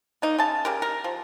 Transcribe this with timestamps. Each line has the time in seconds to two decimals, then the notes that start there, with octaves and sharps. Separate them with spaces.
0.22 A#3 D#4
0.38 C#3 A5
0.65 C#3 G4 A#4
0.82 A#4
1.04 F3